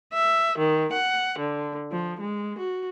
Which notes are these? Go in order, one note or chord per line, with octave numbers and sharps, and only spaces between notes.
E5
D#3
F#5
D3
F3
G#3
F#4